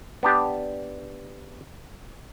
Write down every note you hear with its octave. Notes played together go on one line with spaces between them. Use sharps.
B3 D4 G4